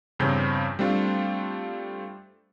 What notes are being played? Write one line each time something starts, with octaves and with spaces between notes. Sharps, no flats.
E2 G2 C#3 C4 G6
G3 A3 C4 D4 F4